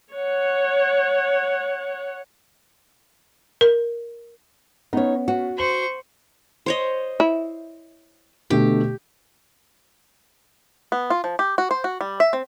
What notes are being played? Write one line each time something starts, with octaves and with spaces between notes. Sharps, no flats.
C#5 F#5
A#4
B3 C#4 D#4 C#5
F#4
C5 C#6 F#7
C5 C#5 D#5
E4
B2 D3 A3 G4
B3
F4
F3
G4
F#4
C5
F#4
G3
E5
C4